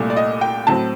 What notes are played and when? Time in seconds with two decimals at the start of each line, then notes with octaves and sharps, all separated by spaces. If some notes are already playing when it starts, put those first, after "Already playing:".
Already playing: C2 A#2 A3
0.10 D5
0.17 D#5
0.41 G5
0.67 A2 F#3 C4 A5